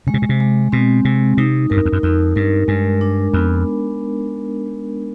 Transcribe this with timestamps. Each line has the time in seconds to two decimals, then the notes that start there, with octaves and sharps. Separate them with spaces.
0.07 C#3 G#3
0.14 C3
0.22 B2
0.29 C3
0.40 G#3
0.72 B2 C4
1.05 C3 G#3
1.37 C3 D#4
1.70 G2 A#4
1.77 F#2
1.85 F2
1.93 F#2
2.03 F2 D#4
2.36 G2 A#4
2.68 G2 G#3
3.01 D4
3.34 F2 B3